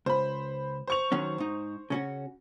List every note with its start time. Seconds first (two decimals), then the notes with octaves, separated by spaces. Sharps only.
0.06 C#2 C5 B5
0.88 C5 C#6 F7
1.12 D#3 F#3 C#4
1.38 G#2 D#4
1.90 C#3 C#4 F#4